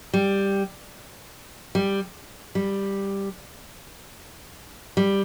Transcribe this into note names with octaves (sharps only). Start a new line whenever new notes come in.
G3
G3
G3
G3